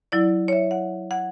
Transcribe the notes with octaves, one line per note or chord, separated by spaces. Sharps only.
F#3 E4 D5
C#5 E5
F#5
F#5 G#6